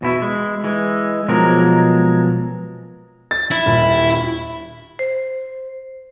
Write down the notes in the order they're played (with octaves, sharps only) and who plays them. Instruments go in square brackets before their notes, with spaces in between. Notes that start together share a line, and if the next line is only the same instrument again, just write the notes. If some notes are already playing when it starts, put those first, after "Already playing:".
[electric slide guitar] E2 B2 E4
G#3
E3 G#3
B2 F3 F#3 G#3 A#3 A#4
[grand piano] A6
[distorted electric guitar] E4
[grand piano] D#1 B5
[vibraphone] C5